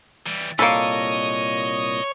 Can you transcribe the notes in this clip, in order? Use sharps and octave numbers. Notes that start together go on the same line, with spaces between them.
E3 G3
C2 A#2 A#3 A4 C#5 D#5 B5